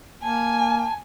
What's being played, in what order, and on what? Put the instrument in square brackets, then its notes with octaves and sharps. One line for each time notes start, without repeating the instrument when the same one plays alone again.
[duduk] A#3 [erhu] G#5 [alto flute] A5